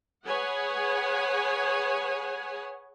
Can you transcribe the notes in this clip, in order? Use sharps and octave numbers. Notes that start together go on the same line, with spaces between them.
G#4 B4 C#5 F#5 G#5